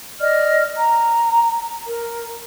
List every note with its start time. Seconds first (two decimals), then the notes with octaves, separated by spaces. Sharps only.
0.19 D5 D#5 F6
0.77 A#5
1.86 A#4